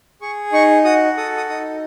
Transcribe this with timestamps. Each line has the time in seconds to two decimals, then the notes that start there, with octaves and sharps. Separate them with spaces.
0.22 G#4 C#6
0.53 D#4 C#6
0.85 F#4 D#6
1.17 A4 D#6
1.37 D#6
1.49 D#4 D#6